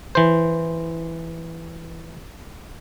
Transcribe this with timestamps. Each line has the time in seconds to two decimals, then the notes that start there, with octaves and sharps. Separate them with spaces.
0.15 E3 C5